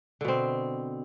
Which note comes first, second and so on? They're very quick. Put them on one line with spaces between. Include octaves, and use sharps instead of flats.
D3 B2 C4